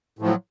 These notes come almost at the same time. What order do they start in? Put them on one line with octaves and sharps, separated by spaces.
A2 F3 F#3